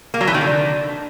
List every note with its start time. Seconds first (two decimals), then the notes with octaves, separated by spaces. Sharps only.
0.14 A#3
0.21 F#3
0.27 E3
0.34 D#3
0.41 D3